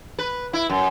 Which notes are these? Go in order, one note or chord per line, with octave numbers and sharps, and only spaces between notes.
B4
E4
F#2